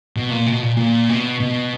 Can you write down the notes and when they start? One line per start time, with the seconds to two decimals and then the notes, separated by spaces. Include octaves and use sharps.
0.16 B2
0.31 A#2
0.46 B2
0.62 A#2
0.77 A#2
1.09 B2
1.40 B2